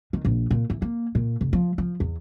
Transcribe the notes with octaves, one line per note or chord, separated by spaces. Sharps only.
D#3
A#1
A#2
E3
A#3
A#2
F1
F3
F3
E2